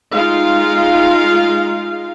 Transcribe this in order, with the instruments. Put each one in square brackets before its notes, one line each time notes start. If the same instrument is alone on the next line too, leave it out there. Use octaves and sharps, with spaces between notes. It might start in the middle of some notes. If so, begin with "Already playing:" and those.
[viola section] G#3 D#4 F4 F5